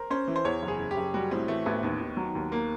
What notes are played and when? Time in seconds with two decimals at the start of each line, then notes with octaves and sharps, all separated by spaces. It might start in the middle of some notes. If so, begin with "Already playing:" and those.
Already playing: A#4 C5
0.10 C#4 C5
0.28 E3
0.36 C5
0.45 E2 C#5
0.62 F#1
0.68 G#4
0.79 C#3
0.91 G4
0.97 F#1
1.14 G3 F#4
1.31 A2 C4
1.48 E3 A3
1.66 A1 B3
1.83 D#2 B3
2.00 D#3
2.17 F#3
2.35 D#2
2.52 A#3